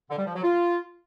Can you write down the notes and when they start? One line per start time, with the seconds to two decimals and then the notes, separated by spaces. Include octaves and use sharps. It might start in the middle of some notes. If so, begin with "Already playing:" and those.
0.10 D3
0.18 G3
0.26 F3
0.35 F#3
0.43 F4